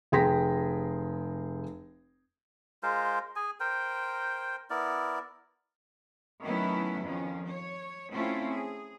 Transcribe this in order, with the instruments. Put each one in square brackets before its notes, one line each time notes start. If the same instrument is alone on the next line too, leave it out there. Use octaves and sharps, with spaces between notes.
[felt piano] F1 G#4 G5 C6 A#6 B6
[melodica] G#3 F4 A#4 C5
G#4 G#5
A#4 C5 G5
B3 E4 A#4 D5
[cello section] D#3 F#3 A3 B3 C#4 E4
F2 D#3 F3 C#4
C#5
A3 C4 C#4 E4 F4
G#4